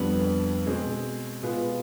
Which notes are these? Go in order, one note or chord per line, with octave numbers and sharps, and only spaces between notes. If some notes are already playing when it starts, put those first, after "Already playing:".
Already playing: F2 D3 G3 B3 D4
B2 G#3 C4
B2 G#3 B3 F4